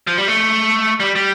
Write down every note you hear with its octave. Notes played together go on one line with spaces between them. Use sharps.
F3
G3
A3
G3
G3